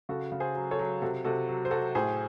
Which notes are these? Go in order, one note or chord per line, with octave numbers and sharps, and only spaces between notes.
C#3 F#4 A4
C#3
G#4 C5
F#3
A4 C#5
F#3
C3 F#4 A4
C3 F#4 A4
F#3
C5
F#3 F#4 A4
A2 G#4 C5